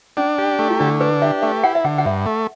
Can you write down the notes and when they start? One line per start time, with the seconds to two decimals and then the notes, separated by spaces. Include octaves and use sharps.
0.17 C#4 D4
0.38 G4
0.59 A3
0.70 E4
0.80 D3 D4
1.00 D4 B4
1.22 G4 E5
1.42 A3 E5
1.64 E4 F#5
1.75 E5
1.84 D3 F#5
1.98 F#5
2.05 G2 E5
2.26 A3